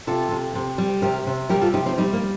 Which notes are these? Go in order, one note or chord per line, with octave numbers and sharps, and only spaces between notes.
C3 F4 A4
C3
C3
G3
C3 G4 A#4
C3
G3 G4 A#4
F4 A4
C3 D#4 G4
C4 D#4
G3 C4 D#4
A#3